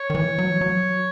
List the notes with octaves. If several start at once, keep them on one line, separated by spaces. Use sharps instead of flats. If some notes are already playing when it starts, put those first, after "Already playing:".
Already playing: C#5
D#3
E3
F#3
E3
F#3